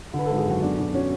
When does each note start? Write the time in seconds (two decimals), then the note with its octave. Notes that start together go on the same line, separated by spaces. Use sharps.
0.14 D3
0.19 B4
0.26 G#1 A4
0.38 G#4
0.46 F#2 F#4
0.62 B3 D4
0.78 B2 D4
0.94 F#3 C#4